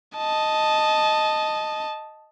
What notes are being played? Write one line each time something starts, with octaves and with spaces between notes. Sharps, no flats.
D#5 A5